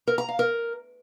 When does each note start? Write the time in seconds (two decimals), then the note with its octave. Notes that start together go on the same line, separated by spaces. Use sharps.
0.07 A#4
0.18 A#5
0.28 F5
0.39 A#4